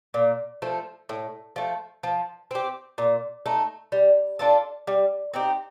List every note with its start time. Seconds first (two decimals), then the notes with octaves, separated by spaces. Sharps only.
0.14 A#2
0.62 F3 A3
1.09 A2
1.56 F3 A3
2.03 F3
2.51 C4 G4
2.98 A#2
3.46 A3 D#4
3.92 G3
4.39 D4 F4 A4
4.87 G3
5.34 C4 D#4 G4